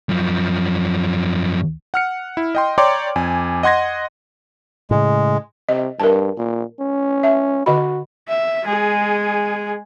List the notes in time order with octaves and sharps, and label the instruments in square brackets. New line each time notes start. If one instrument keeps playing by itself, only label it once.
[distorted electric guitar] F#2 F3
[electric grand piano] F#5 F6 C#7
E4
D#5 G5 C6
C#5 D5 G5 A#5 C6 D6
F2 G#5
D#5 F#5 C6 G#6 A#6
[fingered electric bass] A2 C#3 [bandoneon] G#3
[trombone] C3 [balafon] D#5
[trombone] G2 [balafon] A#4 A5
[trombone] A#2
C#4
[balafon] E5 A5
[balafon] D3 D#5 B5 [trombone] F#4
[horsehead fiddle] E5
G#3 G#4